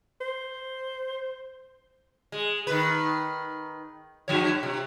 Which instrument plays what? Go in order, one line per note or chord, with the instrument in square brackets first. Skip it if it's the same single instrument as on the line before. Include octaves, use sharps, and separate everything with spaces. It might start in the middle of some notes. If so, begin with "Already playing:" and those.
[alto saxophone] C5
[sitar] G#3
D#3 B4
G2 F3 C#5
C3